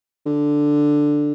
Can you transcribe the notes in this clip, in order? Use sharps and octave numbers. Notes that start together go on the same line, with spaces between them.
D3